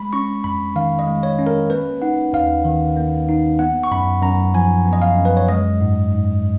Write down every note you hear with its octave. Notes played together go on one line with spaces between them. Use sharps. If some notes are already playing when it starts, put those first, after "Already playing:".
Already playing: G#3 B5
C#4 C#6
F2 B5
D#3 F5
D#5
G#3
C#5
C#4
A#4
A#3 B4
D#4 F#5
D#2 F5
D#3
A#3
D#4
B3 F#5
C#6
F#2 B5
F#2 A#5
F3 G#5
B3
D#5
F5
F#2
B4
C#5
G#3 D#5
G#2
G#2